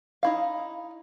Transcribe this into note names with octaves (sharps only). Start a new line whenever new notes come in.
D#4 E4 F5